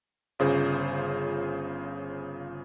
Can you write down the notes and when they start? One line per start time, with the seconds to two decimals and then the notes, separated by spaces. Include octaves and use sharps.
0.39 G1 C#3 F4 G#4 C5